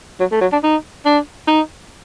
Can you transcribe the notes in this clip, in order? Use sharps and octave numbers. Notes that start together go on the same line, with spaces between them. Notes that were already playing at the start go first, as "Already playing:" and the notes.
F#3
A3
F#3
D4
D#4
D4
D#4